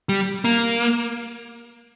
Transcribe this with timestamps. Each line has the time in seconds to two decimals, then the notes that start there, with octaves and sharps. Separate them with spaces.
0.09 G3
0.45 A#3